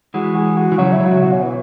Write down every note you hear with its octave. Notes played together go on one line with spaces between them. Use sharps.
E3 G#3 F#4
G#4
F#4
E3
C#3 F#3 C#4
E4
C#3 F#3
F#4
B2 F#4
C#4
E3